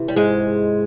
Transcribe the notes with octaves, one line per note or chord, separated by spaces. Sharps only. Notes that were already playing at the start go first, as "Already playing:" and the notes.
Already playing: C3 E3
G3
G#2 G#3